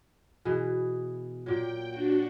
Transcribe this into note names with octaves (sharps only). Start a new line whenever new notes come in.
B2 E3 G#4
A#2 F#3 G5
D4 F#4